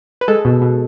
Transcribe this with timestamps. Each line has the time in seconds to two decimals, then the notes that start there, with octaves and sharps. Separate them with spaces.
0.21 B4
0.28 G#3 A4
0.45 B2
0.62 B2